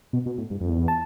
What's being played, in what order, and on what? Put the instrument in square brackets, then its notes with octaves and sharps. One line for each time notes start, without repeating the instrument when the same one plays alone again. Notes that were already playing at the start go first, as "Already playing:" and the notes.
[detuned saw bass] B2
B2
A2
G2
F2
E2
[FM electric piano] A5